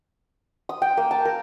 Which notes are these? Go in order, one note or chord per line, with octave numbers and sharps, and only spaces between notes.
D#6
G5
A#3
A5
A#4